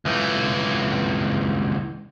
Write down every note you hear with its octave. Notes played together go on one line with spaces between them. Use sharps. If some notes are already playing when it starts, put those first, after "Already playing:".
C#2 E3